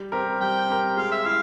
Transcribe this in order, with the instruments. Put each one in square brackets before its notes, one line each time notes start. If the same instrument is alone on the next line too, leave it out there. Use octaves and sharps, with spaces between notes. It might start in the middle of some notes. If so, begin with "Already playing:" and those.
Already playing: [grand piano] G3
C4 G4 A#4
[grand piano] G3 [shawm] G5
[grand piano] C4 G4 A#4
[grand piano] G#3 [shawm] F5
[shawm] E5
[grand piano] E4 [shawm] F5